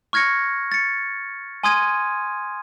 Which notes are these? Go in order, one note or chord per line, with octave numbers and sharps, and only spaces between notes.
C#6 F6 G#6 A#6 C#7
A6 C#7
G#5 C6 D#6 F6 G#6 D#7